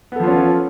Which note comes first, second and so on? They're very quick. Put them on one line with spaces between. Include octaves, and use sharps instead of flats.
B3 A4 F3 F4 C#4